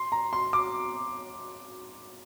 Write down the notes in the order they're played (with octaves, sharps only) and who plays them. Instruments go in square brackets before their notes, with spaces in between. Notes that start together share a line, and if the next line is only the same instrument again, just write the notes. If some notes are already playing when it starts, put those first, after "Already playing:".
Already playing: [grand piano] C6
A#5
C6
D6